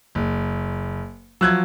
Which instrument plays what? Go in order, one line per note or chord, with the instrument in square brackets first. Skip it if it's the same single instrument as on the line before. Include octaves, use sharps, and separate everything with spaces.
[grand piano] F#1
[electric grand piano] F3 F#3 [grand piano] E6 F#6 G#6